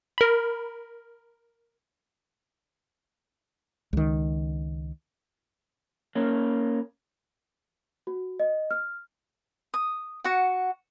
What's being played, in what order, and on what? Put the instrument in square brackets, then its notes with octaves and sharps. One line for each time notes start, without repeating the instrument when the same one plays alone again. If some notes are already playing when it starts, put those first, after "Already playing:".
[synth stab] A#4 B5
[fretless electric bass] C#2 D#3
[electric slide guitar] A#3 C#4
[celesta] F#4
D#5
F6
[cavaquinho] D#6
F#4 F#5